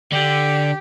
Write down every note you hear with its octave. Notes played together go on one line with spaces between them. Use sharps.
D3 G4